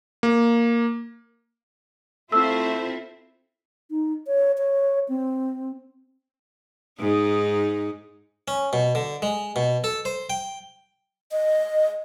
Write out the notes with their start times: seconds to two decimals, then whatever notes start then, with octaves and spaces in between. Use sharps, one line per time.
0.23 A#3
2.32 A3 C4 E4 F4 A4 C5 E5 E6
3.90 D#4
4.27 C#5
4.58 C#5
5.09 C4
6.99 G#2 D#4
8.48 C#4
8.73 B2
8.95 D3
9.22 G#3
9.56 B2
9.84 A4
10.05 C5
10.30 G5
11.32 D#5